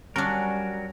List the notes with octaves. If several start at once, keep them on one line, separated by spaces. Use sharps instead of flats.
F#3 G3 C#4 D4 F#4 A#4